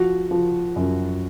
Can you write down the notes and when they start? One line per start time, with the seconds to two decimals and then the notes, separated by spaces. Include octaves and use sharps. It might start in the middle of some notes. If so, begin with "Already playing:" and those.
Already playing: F3 F#4
0.31 F3
0.76 F#2